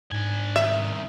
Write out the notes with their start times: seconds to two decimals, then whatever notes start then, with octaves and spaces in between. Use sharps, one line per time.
0.12 G#2 D4 G#5
0.56 C2 D#3 E5